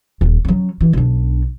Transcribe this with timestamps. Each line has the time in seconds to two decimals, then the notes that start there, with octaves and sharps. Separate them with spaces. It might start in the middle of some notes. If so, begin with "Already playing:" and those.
0.21 D#1
0.45 F#3 C#4
0.81 E3
0.93 B1 D4